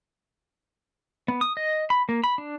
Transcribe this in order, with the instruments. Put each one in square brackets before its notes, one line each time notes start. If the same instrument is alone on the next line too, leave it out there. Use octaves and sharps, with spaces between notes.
[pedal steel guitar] B3
D#6
D#5
B5
A#3
B5
D4